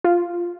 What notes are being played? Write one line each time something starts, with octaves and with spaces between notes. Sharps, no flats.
F4